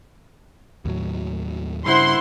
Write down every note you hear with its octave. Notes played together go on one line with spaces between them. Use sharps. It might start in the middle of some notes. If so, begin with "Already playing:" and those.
D#2 A2 F#3
G2 C#3 E4 C5 F#5 C6